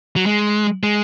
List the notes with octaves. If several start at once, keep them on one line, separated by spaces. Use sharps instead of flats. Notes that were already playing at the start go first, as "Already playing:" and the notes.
F#3
G#3
G#3